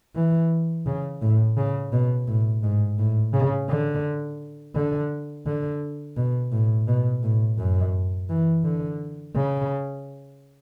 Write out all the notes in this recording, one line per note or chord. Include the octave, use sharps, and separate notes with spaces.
E3
C#3
A2
C#3
B2
A2
G#2
A2
C#3
D3
D3
D3
B2
A2
B2
A2
F#2
E3
D3
C#3